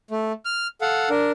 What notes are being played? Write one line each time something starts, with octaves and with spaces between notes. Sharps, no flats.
A3
F6
A4 F5 F#5
D4 A#4